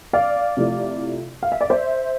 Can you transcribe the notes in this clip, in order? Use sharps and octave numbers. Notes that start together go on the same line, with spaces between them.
D5 F5
C3 F3 A3 E4
F5
E5
D5
C5 E5